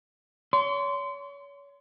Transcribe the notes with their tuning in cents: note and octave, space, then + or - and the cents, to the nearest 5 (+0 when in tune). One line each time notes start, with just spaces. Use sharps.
C#5 +35 C6 -20